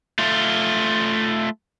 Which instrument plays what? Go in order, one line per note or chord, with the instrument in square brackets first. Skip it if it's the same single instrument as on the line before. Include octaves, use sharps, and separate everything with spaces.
[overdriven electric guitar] A3 F4